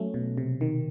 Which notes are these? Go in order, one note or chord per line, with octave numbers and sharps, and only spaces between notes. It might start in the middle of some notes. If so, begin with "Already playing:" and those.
Already playing: F#3 A3 C#4
B2
C3
D#3